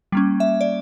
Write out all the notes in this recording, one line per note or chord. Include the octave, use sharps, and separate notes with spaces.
G3 A#3 C#4
E5
D5